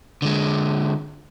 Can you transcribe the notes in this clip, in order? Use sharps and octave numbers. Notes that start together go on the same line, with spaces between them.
D3 G#3